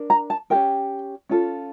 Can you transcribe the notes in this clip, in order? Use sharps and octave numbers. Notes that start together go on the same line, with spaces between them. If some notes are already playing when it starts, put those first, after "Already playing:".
Already playing: D4 A#4
A#5
A5
C#4 G4 A#4 G5
C#4 F4 A4